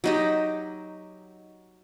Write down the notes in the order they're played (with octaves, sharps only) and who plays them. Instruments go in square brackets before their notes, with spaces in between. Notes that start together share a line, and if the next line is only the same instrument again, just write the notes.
[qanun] F#3 D#4 G4